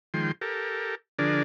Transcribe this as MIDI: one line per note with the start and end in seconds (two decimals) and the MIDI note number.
0.14 0.32 51
0.14 0.32 53
0.14 0.32 56
0.14 0.32 79
0.14 0.32 84
0.41 0.95 67
0.41 0.95 69
0.41 0.95 70
1.19 1.43 50
1.19 1.43 53
1.19 1.43 62
1.19 1.43 68
1.19 1.43 70
1.19 1.43 74